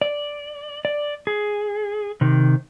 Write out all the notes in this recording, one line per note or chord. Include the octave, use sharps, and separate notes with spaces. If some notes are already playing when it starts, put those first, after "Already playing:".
D5
D5
G#4
C3 D#3